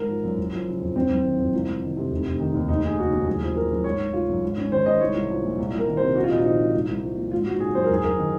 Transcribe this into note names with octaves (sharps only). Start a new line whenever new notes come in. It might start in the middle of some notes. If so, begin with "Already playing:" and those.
Already playing: G#1 A#4
F3
F#2
F#1
F3
C#3
F2
F#1 C4
F#1
D#3
F2
C2
C2
D#3
C3
F1
F1
D#3
D#2
F1 D#4
F1 G#4
C#3 F#4
D#2
F#1 G#4
F3
C#3 A#4
F#2
G#1 C#5
G#1
C#3 F4
F#2
G#1
G#1 C#4
D#3 C5
G#2 D#5
C2 C#5
C2
F3
A#2
C2
C2
A#4
D#3
C5
C3
A#1 F#4
F4
A#1 D#4
F4
D#3 D#4
G#2
C2
C2
F3
A#2
G#1 F4
G#1 F#4
C#3 G#4
F#2 C5
A#4
F#1 G#4
F#1 A#4
D#3